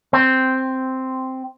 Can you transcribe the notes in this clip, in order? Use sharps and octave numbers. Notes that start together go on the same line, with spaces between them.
C4